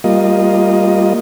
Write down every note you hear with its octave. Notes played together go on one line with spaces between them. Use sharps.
G3 A#3 F4 D#5